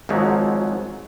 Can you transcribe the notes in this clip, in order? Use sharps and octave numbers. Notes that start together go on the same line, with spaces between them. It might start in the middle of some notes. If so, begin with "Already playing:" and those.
G#1 G#2 F3 F#3